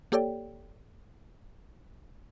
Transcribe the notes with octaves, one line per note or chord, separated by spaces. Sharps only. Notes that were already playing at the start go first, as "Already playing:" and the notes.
A#3 G4 A4 C#5 D5 G5